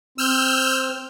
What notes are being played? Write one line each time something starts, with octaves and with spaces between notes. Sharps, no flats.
C4 E6 F6 G6